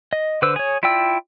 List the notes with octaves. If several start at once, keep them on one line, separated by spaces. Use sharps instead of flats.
D#5
D3 B4 C5 E6
G#4 C#5
E4 F4 D5 G5 E6